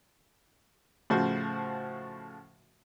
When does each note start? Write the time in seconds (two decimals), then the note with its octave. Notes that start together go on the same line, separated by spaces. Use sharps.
1.10 A2 C#3 F3 F#4 C5